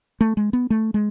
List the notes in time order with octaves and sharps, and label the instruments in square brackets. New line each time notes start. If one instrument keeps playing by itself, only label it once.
[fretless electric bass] A3
G#3
B3
A3
G#3